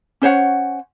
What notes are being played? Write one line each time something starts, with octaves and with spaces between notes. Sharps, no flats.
C#4 C5 C#5 F#5